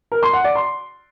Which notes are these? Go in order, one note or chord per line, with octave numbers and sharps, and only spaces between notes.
A#4
C6
F#5
D5
C6